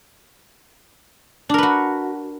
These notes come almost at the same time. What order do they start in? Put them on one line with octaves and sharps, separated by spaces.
D4 A#4 B4 F#4